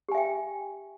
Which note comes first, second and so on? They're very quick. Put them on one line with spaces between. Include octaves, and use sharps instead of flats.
G4 G#5 E5 G5